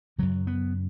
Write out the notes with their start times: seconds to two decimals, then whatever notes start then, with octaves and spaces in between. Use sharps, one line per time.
0.18 F#2 C#3 F#3
0.47 B3